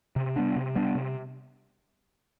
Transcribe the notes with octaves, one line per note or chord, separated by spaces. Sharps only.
C3
G3 B3 D4
C3
G3 B3 D4
C3